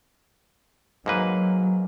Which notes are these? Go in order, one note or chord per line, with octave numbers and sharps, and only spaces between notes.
G#2 F#3 A#3 B4